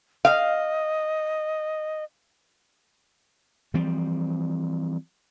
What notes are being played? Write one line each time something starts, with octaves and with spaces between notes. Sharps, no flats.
D#5 F5
E3 F3 G3 C4